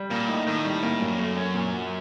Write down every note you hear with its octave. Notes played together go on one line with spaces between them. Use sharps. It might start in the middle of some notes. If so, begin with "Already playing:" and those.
Already playing: G3
A#2 A#3
A2 D#4
A2 D#3
G3
A#3
F#2 F#3
A3
C#4
A#2
F#3